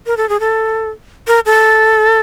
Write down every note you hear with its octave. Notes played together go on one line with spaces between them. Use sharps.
A#4
A4
G#4
A4
A#4
A4